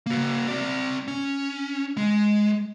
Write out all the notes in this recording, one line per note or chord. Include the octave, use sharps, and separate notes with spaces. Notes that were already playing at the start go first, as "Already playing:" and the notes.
A#3 F#4
C4 D5
C#4
G#3